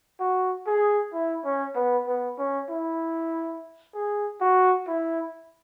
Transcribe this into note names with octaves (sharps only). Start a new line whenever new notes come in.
F#4
G#4
E4
C#4
B3
B3
C#4
E4
G#4
F#4
E4